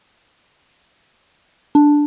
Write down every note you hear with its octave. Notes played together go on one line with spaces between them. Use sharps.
D4